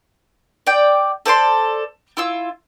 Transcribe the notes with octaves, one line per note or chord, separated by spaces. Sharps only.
D5 G5
A4 C5 D5 C6
E4 F4 E6